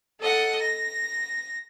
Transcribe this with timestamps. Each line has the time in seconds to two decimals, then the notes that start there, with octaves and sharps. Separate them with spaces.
0.20 A4 D#5 F#5
0.60 A#6